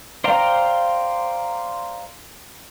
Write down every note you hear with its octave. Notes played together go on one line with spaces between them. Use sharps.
C5 D5 F5 G5 A#5